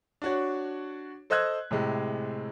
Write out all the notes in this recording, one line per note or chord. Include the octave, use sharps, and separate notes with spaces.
D4 F#4 C#5
A4 C5 D#5 E6 F#6 G#6
A2 C3 G#3